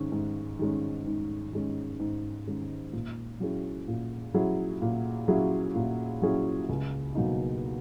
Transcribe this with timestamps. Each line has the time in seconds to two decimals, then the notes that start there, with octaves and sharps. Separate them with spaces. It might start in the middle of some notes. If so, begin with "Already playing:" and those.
Already playing: G#2 D#3 G#3 C#4
0.12 G#2
0.59 D#3 G#3 C#4
1.06 G#2
1.53 D#3 G#3 C#4
2.00 G#2
2.47 D#3 G#3 C#4
2.93 A#2
3.40 F#3 C#4 E4 G#4
3.88 A#2
4.34 F#3 C#4 E4 G#4
4.82 A#2
5.28 F#3 C#4 E4 G#4
5.75 A#2
6.22 F#3 C#4 E4 G#4
6.69 C#2
7.15 B2 F#3 A#3 D#4